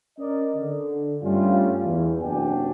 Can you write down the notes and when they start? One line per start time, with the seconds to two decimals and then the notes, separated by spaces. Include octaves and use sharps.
0.18 C#4 A#4 D5 D#5
0.54 D3
1.22 G2 G3 A3 C#4 F4
1.84 E2
2.21 F#1 C3 D4 F#4 G5 G#5